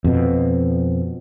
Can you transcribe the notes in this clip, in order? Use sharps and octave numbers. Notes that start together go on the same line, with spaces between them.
F2 B2